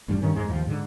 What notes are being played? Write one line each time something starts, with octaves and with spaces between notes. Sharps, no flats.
A1 G2 G3 D4
G2 D#3 C#4
F2 G#2 G#3
D#2 F3
G#2 D3